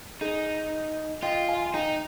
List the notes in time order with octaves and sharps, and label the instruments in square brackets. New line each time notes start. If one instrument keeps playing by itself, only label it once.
[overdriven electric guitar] D#4 [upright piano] G#4
[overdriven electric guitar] F4 [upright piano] D#5 G5
[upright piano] F5 G#5
[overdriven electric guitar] D#4 [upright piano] G5 A#5